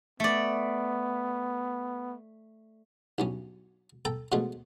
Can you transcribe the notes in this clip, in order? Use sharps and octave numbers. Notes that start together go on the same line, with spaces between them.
A3 B3 D5
B1 G2 C#4
A4 G5 A#5
B2 D3 F3 G#3 A3